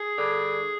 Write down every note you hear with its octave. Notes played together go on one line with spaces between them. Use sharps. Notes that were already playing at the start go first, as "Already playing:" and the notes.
Already playing: G#4
G2 D3